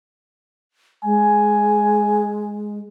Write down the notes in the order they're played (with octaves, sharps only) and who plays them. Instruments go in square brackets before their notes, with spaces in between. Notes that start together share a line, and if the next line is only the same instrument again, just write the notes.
[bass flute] G#3 [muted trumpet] G#5